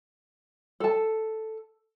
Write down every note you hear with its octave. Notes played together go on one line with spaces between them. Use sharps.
A4 A5